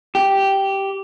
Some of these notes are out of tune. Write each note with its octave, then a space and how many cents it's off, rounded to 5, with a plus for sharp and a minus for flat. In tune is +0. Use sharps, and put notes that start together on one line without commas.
G4 -5